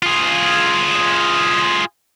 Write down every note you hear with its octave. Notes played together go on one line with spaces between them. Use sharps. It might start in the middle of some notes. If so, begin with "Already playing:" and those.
F4 G#4